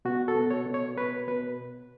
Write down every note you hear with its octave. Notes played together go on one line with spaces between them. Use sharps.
B2 F#4
A4
B2
C#5
B2
C#5
B2 B4
B2 B4